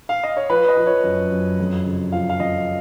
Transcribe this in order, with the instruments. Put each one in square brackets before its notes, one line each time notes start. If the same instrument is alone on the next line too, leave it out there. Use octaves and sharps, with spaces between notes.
[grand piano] F5
D#5
C#5
F3 B4
D#5
F3
C#5
F#2
F#2
F2
C#3
F3 F5
F5
F2 D#5